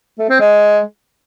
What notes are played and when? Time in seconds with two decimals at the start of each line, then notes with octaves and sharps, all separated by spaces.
0.19 A3
0.29 C4
0.40 G#3